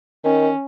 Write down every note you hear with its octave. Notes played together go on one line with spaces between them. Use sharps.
D#3 C#4